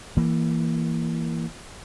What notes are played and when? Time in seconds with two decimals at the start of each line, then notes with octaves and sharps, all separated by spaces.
0.17 E3 A#3